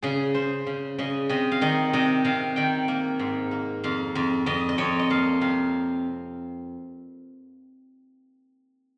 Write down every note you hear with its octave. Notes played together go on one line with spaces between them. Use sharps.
C#3 G#4
C#3 C5
C#3
C#3 D#5
C3 D#5
F5
D#3 D#5
C3 D#5
C3 F5
D#3 G5
A#3
G#2
A#3
F2 F5
F2
F2 D#5
D#5
F2 C#5
D#5
A#3 F5
C3 F5